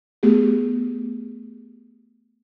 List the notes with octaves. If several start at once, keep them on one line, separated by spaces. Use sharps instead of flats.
A3 B3 G4 G#4